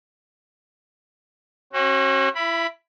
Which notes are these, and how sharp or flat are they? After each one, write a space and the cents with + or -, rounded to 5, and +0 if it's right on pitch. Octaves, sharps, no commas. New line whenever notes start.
C#4 -40 F#4 +20
E4 +25 B5 +0